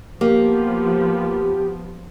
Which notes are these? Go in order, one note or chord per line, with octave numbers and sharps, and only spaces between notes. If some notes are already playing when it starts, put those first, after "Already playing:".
F3 A#3 B3 G4